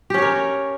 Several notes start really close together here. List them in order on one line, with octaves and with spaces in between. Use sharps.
G4 C#4 C#5 A#4